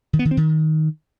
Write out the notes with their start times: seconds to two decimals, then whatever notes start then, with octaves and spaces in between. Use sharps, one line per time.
0.13 D#3
0.19 B3
0.25 D#3
0.31 C4
0.37 D#3